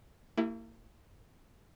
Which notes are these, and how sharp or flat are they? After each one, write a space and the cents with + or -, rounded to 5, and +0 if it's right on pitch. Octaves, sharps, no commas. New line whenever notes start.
A#3 -40 E4 +0 G4 -15